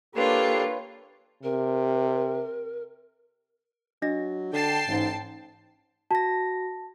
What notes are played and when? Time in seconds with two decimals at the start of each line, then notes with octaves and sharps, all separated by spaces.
0.15 A#3 D4 F4 G4 A4 B4 C#5
1.43 C3 A#4
4.02 F#3 D4 D#5 A#6
4.53 D3 G5 A5 C7
4.87 A1 G#2
6.11 F#4 A5 A#6